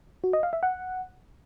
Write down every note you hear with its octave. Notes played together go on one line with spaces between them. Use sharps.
F#4
D#5
F5
E5
F#5